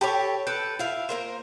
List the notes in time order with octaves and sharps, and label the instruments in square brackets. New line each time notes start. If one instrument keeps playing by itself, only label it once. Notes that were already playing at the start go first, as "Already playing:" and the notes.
[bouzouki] G4 A4 C#5 [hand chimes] A5 B5 D6
[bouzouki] A4 B4 [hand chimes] G6 D7
[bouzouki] E4 F5 [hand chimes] F4
[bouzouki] A#3 A#4 C5